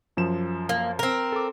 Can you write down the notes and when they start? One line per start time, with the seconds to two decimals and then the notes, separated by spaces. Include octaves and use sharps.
0.17 F#2 F3 E7
0.69 A#3
0.99 C4 A#4
1.32 A4 D6